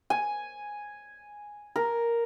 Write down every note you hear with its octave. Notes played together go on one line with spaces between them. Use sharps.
G#5
A#4